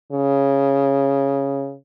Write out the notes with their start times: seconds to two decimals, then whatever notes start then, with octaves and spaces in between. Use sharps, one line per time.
0.12 C#3